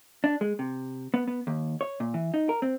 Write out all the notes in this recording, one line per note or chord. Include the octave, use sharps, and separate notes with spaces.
D4
G#3
C3
B3
B3
D#2
C#5
A#2
E3
D#4
A#4
C4